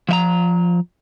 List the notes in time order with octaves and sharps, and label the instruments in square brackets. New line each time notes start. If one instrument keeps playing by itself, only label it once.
[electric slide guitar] F3 E5 A#5